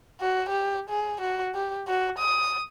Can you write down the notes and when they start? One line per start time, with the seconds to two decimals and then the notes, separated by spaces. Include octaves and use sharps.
0.21 F#4
0.49 G4
0.90 G#4
1.21 F#4
1.55 G4
1.88 F#4
2.19 D#6